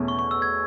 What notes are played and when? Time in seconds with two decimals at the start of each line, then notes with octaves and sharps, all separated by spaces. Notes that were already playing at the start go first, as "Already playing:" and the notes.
Already playing: E2 B2 A3 C#4
0.08 C#6
0.19 C#6
0.31 E6
0.42 G#6